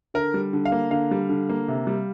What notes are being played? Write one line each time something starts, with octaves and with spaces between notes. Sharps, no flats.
D3 A#4
G3
D3
F5
A#3
D3 F5
G3
D3
A#3
C3
G3